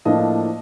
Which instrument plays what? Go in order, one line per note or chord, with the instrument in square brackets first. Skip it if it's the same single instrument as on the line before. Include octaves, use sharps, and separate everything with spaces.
[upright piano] A2 F3 A#3 D4 D#5